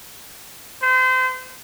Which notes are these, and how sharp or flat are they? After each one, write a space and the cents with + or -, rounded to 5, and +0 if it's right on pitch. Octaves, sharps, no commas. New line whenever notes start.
C5 -35